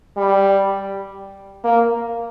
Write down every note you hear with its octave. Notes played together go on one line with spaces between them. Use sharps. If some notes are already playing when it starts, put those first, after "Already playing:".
G3
A#3